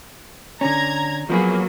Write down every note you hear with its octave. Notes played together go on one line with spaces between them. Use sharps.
D3 C#4 A#5 G#6
F3 F#3 A#3 B3 G#4